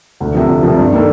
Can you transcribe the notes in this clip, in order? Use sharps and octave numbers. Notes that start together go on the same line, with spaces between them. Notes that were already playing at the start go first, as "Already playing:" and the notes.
D2
C3 F3
D2
C3 F3
G2
D#3 A#3 D4 A4